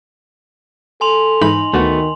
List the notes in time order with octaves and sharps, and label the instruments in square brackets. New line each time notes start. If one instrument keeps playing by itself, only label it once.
[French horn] A4 [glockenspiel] G#5 C6 F7
[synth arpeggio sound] G#2 E3 B5 [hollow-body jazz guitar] D#4 [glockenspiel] F#7
[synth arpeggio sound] D2 [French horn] D#3 [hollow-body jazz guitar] A3 B3 F#4